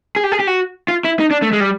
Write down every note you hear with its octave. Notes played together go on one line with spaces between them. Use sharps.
G#4
G4
G#4
G4
F#4
F4
E4
D#4
D4
A3
G#3
G3